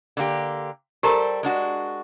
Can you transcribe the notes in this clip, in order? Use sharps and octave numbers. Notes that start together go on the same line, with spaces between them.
D3 A#3 G4
G3 G4 A4 A#4 C5 A#5
G#3 D4 F#4